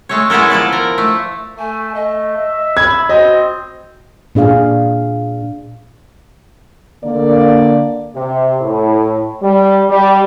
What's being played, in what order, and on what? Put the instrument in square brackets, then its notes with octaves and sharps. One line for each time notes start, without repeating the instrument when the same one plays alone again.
[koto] G#3 A3 C#5
G#3 B3 E4 A4 A#4
F3 E4 A4 D5
A#4
A3
[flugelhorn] A3 [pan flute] G#5
[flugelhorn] A3 [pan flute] D#5
[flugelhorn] E5
[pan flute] B5 [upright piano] G#6
[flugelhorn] C4 [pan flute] F#4 [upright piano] D#5
[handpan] A#2 D4 G#4 F5
[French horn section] D3 A#3 [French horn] D5
[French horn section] C3
A2
G3
G3